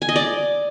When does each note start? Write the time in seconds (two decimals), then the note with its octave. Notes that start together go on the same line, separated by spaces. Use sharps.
0.02 G#5
0.09 D#5
0.16 D5